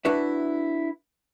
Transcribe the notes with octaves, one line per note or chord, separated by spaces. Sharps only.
D4 E4 F#4 B4 E5